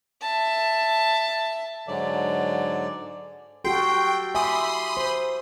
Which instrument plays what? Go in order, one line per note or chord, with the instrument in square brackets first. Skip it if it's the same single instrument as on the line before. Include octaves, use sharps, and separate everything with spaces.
[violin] E5 A5
[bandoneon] G#2 D3 F#3 D5
[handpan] F#4 G4 A4 [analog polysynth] G5 [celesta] C6 C7
[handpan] E5 [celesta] G#5 D6 [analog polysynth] B5 C6 D#6
[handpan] C5